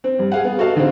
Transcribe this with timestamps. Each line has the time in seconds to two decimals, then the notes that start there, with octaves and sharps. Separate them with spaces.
0.04 C4
0.19 G2
0.32 G#4 F5 F#5
0.44 B3
0.59 F#4 A4 D#5 F5
0.76 D3 D#3 C4